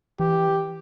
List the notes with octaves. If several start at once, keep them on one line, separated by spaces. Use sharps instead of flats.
E3 G4